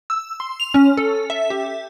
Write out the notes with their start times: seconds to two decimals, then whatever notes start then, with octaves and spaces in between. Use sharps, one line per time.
0.10 E6
0.40 C6
0.60 F7
0.74 C#4
0.97 A4
1.30 E5
1.50 G4